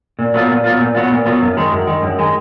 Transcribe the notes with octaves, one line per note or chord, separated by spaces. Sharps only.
A#2
F#3 B3 F4
A#2
F#3 B3 F4
A#2
F#3 B3 F4
A#2
F#3 B3 F4
F#2
D#3 G#3
F#2
D#3 G#3
F#2
D#3 G#3